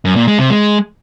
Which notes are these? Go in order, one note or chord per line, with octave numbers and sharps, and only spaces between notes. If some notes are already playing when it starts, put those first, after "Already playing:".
F#2
A#2
G#3
C3
G#3